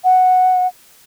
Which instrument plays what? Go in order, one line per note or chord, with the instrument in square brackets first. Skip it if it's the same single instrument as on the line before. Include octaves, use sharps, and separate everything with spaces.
[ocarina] F#5